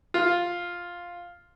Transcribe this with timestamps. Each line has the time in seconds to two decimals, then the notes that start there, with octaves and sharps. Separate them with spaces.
0.14 F4